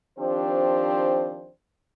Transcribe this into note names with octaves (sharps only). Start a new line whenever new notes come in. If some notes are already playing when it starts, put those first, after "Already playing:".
D#3 F3 C4 D4 G4 C5